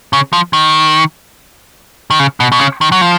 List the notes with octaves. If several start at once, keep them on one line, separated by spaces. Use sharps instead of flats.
C#3
F3
D#3
D#3
C#3
B2
B2
C#3
D#3
F#3
F3